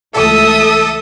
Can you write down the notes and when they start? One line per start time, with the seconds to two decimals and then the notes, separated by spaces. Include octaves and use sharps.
0.14 C#2 E3 A3 A4 E5 D#6